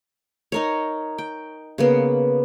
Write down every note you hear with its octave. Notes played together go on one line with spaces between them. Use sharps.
D#4 A#4 C#5
G5
C#3 A#3 B3